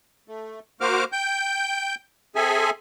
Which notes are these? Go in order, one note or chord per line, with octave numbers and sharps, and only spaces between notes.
A3
A#3 F#4 C5 D6 F6
G5 G6
C4 G#4 A4 E5 G#5